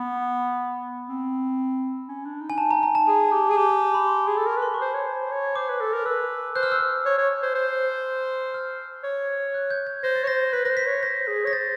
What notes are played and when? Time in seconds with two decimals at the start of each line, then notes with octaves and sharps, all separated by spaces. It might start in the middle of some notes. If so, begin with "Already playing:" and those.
Already playing: B3 B5
1.09 C4
2.08 C#4
2.25 D4
2.41 D#4
2.50 G#5
2.58 A5
2.71 A#5
2.83 A#5
2.95 A5
3.07 G#4 G#5
3.33 G4
3.50 G#4 G#5
3.57 G4 A5
3.70 A5
3.83 A5
3.94 B5
4.07 C6
4.24 G#4 C6
4.37 A4 D6
4.47 A#4
4.52 C#6
4.57 B4
4.62 C6
4.74 C#6
4.81 C5
4.94 C#5
5.06 C5
5.31 C#5
5.56 C5 D6
5.69 B4
5.81 A4
5.93 A#4
6.05 B4 E6
6.55 C5 F#6
6.63 F6
6.72 E6
6.80 F6
7.05 C#5
7.18 C#5
7.42 C5
7.55 C5
8.54 F6
9.04 C#5
9.54 F#6
9.71 G6
9.87 G#6
10.03 C5 A#6
10.16 A6
10.24 C#5
10.27 C5 A#6
10.53 B4 B6
10.65 B4 C5 A#6
10.77 B6
10.86 C#5
11.03 C5 A#6
11.27 G#4
11.45 C#5 A#6
11.53 C5 A6